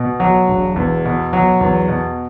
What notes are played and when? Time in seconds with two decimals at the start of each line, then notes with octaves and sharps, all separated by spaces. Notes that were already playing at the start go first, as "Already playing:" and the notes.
Already playing: B2
0.20 F#3
0.48 E1
0.76 E2
1.05 B2
1.33 F#3
1.61 E2
1.88 B2